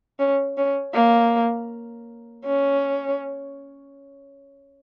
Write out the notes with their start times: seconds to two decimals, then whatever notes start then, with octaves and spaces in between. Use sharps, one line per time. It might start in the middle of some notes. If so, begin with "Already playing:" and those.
0.19 C#4
0.58 C#4
0.94 A#3
2.46 C#4